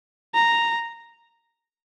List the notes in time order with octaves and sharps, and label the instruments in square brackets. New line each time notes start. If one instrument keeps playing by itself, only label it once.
[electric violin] A#5